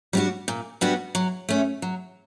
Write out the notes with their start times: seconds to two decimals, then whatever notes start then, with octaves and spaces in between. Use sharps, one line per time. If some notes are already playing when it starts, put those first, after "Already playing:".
0.13 G3 B3 D4 F#4
0.48 A#2
0.81 G3 B3 D4 F#4
1.15 F#3
1.49 A3 C#4
1.82 F#3